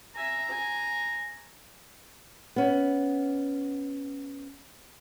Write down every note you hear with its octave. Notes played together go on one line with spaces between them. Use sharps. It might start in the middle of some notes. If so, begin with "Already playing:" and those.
E5 G#5 A#5
G#5
B3 C#4